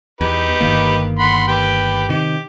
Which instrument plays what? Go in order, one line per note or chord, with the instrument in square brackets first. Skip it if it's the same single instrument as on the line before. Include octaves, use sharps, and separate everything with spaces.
[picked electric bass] E2 [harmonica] D#4 G4 B4
[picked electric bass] G1 D#3 A#3
[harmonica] F#5 B5 C6
G4 B4 G5
[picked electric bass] C3 D#3 [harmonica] G4